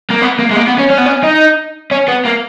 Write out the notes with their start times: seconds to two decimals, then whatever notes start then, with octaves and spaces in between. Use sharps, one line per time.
0.10 A#3
0.22 B3
0.39 A#3
0.51 G#3
0.56 A#3
0.67 B3
0.78 C#4
0.90 C#4
0.98 B3
1.06 C#4
1.23 D#4
1.91 C#4
2.08 B3
2.25 A#3